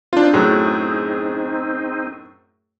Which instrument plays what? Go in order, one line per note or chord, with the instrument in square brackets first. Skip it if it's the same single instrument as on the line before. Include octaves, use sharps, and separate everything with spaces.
[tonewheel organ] C4 D#4 [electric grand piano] D4 F4
[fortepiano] F#2 A2 F#3 [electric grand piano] G#4